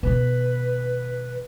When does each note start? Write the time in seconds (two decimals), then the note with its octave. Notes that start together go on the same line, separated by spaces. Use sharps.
0.03 B2 D#3 B4